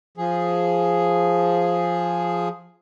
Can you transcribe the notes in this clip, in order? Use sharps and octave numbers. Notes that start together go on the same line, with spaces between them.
F3 G#4